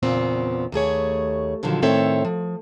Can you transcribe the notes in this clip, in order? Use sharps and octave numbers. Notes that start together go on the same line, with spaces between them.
E2 A#2 C#3 B3 C4
D#2 A3 G#4 C#5
A#2 D3 D#3 F3 F#3
A2 D#3 C4 A4 C#5 E5
F3